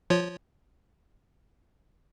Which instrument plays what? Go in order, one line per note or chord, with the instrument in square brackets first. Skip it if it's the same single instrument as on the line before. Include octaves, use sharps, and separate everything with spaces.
[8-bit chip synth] F3 F4 C#5